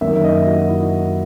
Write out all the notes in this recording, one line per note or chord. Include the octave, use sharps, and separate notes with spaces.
F#2 D#3 A#3 E5
D#5
F#4
E4